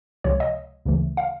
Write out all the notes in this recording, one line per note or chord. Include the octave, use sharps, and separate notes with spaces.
C#2 C3 F3 C#5
D#5
D2 C#3 E3 A3
F5